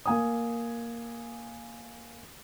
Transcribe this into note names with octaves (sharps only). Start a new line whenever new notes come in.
A#3 G#5 D#6